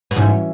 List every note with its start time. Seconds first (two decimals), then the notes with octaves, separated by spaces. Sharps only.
0.11 B2
0.16 G#2 E3 C#4 F#4 E5